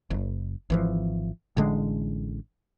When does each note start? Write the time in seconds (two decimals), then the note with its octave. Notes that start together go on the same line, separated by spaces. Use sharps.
0.10 F#1
0.70 G#1 E3 F3
1.57 A1 D3 G#3